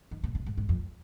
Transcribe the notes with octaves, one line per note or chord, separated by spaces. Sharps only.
D#3
C3
C3
G#2
G#2
F2